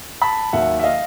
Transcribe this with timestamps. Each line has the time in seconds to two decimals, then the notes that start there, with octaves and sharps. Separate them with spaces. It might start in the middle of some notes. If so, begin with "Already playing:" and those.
0.22 A5 B5
0.53 D#2 D#3 F#3 E5 F#5
0.79 E5
0.84 D#5 F5